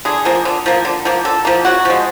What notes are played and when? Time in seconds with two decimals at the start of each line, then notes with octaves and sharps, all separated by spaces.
0.05 D3 G#4
0.25 F3 A#3
0.45 D3
0.66 F3 A#3
0.85 D3
1.05 F3 A#3
1.25 D3 A4
1.45 F3 A#3
1.65 C#3 F#4
1.85 F3 G#3